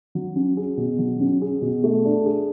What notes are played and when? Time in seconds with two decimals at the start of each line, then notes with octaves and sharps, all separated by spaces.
0.15 F#3
0.36 C#4
0.57 G#4
0.77 B2
0.99 F#3
1.20 C#4
1.42 G#4
1.62 B2
1.84 A3
2.05 D4
2.26 G#4